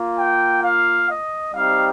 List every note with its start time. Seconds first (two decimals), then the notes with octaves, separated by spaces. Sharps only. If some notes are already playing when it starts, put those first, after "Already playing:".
Already playing: A#3 F4
0.19 G5
0.64 F5
1.10 D#5
1.54 G3 C4 D#4 G4 F5